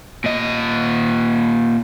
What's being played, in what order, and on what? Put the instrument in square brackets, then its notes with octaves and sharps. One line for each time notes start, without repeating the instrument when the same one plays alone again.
[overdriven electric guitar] A#2 D#5